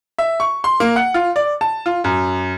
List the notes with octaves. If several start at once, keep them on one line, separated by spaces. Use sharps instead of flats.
E5
C#6
C6
A#3
F#5
F4
D5
A5
F4
F#2